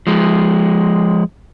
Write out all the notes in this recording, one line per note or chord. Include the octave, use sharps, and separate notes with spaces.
F3 G#3